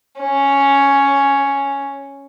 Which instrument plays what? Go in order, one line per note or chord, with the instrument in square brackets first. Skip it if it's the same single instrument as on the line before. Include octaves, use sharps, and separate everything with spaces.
[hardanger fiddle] C#4